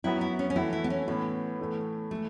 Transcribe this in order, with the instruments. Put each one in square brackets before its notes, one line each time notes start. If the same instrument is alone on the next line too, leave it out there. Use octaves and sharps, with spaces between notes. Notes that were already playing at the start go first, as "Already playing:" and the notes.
[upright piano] F#2 F#3 B3 F#4 [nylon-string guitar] E4
[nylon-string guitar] E4
C#4
C#4
[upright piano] E3 A3 F#4 [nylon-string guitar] E4
[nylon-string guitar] E4
B3
C#4
[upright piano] A2 E3 C#4 E4 [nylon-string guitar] B3
[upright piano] A2 E3 A3
[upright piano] E3 [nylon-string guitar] A3